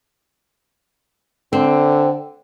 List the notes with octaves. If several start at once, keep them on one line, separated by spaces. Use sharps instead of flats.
D3 C4